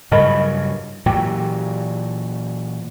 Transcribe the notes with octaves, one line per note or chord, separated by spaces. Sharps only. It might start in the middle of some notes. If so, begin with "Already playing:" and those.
G2 C#3 F#3 A#4 D#5 B5
A#2 E3 F#3 G4